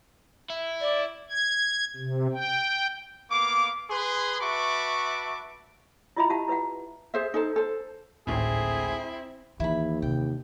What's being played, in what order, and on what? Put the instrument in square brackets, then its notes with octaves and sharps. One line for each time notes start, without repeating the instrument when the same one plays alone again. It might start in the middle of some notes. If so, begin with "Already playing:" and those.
[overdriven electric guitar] E4
[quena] D5
[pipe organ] G#6
C3
G5
[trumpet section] A#3 B3 F5 D6
G#4 B4 C6
F#4 B4 E5 A5 C#6 D6
[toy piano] E4 F4 D#5 E5 A#5 B5
E4 G4 E5 F#5 A5
E4 B4 E5 F#5
[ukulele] G#4 C5 E5
D#4 A4 C5
A4 C5
[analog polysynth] G#1 D2 A2 [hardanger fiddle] C4 [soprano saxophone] E4 [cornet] G#4
[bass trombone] D#2 [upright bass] E3 [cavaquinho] E4 B5
[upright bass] C3 E3 [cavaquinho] G5